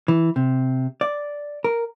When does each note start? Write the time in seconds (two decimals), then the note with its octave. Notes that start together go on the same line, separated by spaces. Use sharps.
0.08 E3
0.36 C3
1.01 D5
1.64 A#4